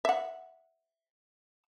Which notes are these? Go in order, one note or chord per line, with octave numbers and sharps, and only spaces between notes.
E5 F#5